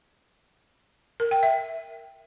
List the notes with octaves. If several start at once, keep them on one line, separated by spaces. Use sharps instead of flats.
A#4
G5
E5